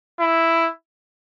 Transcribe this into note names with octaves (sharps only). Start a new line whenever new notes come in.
E4